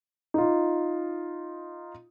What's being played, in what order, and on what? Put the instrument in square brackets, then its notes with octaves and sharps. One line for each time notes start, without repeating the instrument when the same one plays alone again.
[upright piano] D#4 F4